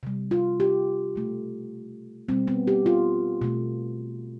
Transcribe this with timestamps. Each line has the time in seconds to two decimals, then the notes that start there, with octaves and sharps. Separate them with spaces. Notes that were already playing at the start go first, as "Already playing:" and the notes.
0.03 C3 G3
0.31 F4
0.60 G4
1.16 B2 A3
2.29 B2 G3 C4
2.47 B3
2.67 G4
2.86 F4
3.42 B2 A3